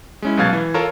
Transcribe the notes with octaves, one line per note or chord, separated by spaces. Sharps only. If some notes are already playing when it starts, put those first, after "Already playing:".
G#3 C#4 E4
C2 B2 F#3 F5 G#6 A6
E3
F4 A4 A#4 C#5 A5